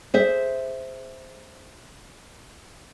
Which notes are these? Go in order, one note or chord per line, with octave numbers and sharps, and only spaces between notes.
G#4 C5 E5